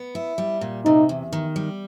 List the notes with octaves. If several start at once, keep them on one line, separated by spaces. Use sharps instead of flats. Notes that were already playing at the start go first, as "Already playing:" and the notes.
Already playing: B3
E4
G3
A#2
C3 D#4
E2
D#3
G3